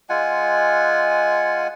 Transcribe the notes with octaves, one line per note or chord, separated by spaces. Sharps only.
G#3 F4 F#5 G#5